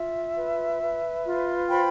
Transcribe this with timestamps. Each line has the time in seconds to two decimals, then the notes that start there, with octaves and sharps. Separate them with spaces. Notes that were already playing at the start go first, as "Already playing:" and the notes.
Already playing: F4 E5
0.37 B4
0.81 B4
1.26 F4
1.69 C5 G5 B5